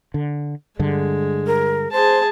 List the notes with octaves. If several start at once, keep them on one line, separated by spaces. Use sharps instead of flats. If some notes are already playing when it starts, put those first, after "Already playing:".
D3
G2 D3 G#3
A#4
G#4 C5 A5